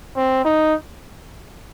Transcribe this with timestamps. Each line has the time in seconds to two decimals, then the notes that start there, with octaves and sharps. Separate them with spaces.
0.16 C4
0.45 D#4